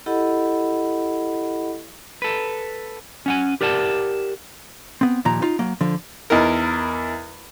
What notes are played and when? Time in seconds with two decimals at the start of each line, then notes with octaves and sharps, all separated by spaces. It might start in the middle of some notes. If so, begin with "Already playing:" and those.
0.06 E4 G4 A4 D#5 F#5 B5
2.22 A4 B4
3.26 C#4 F#5 G#5
3.61 G4 A#4 D5 F#5 A5
5.01 B3 C4
5.25 D#2 A#2 F3 A#5
5.42 D#4 F4
5.59 F#3 A#3
5.81 D3 F3
6.30 E2 D#4 E4 A#4